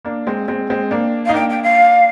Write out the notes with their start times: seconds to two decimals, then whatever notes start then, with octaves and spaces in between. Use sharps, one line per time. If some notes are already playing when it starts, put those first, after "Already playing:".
0.05 A#3 D4
0.27 G#3 C4
0.48 G#3 C4
0.70 G#3 C4
0.91 A#3 D4
1.25 F5
1.29 D#4
1.34 A#3 D4 G5
1.49 G5
1.63 F5